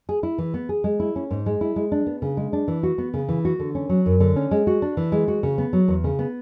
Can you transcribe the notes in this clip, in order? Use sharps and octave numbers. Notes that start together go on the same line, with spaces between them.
G#4
E4
E3
B3
G#4
G#3
E4
C#4
G#2
G#3
E4
G#3
D4
B3
C#3
G#3
D4
E3
F#4
B3
C#3
E3
F#4
D3
C#4
F#3
F#2
D3
C#4
G#3
F#4
D4
E3
G#3
F#4
C#3
B3
F#3
E2
C#3
B3